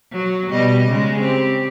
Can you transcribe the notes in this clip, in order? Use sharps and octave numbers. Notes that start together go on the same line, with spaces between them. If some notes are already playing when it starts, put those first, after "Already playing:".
F#3
B2 G3 D#5
C#3 G#3
C4 G4